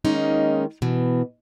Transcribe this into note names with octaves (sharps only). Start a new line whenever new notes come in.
D#3 G#3 A#3 C#4 D#4
B2 E3